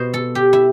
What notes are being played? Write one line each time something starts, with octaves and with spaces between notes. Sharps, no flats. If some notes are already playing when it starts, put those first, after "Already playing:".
Already playing: B2 C5
A4
G4
E4